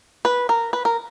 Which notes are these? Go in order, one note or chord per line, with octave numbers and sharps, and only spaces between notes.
B4
A#4
B4
A#4